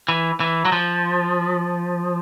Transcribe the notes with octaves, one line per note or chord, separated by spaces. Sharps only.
E3
E3
F#3
F3